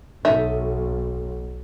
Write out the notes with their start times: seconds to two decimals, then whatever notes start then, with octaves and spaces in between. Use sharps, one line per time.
0.25 B1 D#4 A4 E5